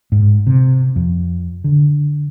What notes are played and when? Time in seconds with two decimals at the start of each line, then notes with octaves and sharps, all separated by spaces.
0.12 G#2
0.47 C3
0.96 F2
1.64 D3